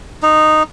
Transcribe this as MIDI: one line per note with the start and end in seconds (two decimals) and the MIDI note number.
0.22 0.63 63